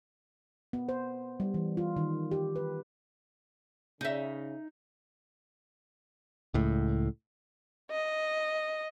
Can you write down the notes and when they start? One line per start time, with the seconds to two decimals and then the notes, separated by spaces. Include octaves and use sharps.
0.73 B3
0.89 C5
1.40 G3
1.54 E3
1.77 F4
1.96 D#3
2.31 G4
2.56 B4
4.01 C#3 D#4 E5
6.54 C#2 A2
7.91 D#5